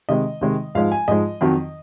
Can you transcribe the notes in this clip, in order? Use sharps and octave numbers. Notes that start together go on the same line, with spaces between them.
C3 D#3 G#3 D#5
C3 D#3 G#3
G#2 F3 G#3 F5
G#5
G#2 F3 G#3 D#5
F2 D#3 F#3